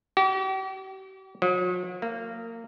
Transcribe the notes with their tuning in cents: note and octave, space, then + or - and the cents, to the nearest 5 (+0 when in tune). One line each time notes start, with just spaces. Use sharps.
G4 -45
F#3 -40
A#3 -20